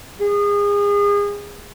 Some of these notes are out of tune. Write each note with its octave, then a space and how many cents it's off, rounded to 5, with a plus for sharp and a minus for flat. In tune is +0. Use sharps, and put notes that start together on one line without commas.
G#4 -30